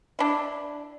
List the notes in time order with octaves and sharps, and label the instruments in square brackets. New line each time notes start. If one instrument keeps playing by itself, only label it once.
[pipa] D4 E4